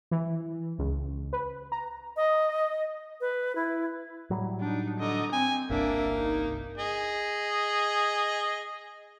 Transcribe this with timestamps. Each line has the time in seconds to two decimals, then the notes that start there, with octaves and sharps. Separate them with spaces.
0.11 E3
0.79 C#2
1.33 B4
1.72 A#5
2.16 D#5
3.21 B4
3.55 E4
4.30 A2 F#3 G3
4.61 D4 D#4
5.00 D3 D#5 A#5
5.32 C4 G#5
5.70 G1 C2 A#3 D4 E5
6.17 D#4
6.78 G#4 D#5